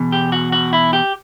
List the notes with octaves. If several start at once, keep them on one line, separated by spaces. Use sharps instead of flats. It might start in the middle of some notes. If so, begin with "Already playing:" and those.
Already playing: E2 B2
G4
F#4
F#4
E4
G4